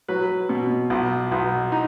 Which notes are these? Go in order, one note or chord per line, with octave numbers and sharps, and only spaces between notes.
F#3 B4
B2
B1
B1
D#4